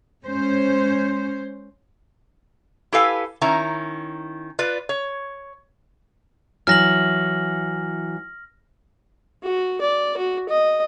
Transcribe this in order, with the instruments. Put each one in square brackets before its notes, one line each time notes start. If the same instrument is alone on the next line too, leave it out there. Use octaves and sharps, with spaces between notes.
[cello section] G#3 C#4 C5
[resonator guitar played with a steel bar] E4 G4 A4 B4 F5 G#5
D#3 C#4 E4 A#5
F4 B4 D5
C#5
[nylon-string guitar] E3 F#3 [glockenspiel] F6 A#6 F#7
[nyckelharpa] F#4
D5
F#4
D#5